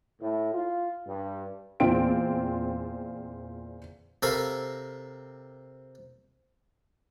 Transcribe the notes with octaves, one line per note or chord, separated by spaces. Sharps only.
A2
F4
G2
E2 A#2 C4 F4 G5 D7
C3 A4 A#4 F5 B5 C#6